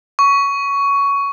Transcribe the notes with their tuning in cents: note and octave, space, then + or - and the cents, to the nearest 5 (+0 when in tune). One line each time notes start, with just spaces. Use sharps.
C#6 +15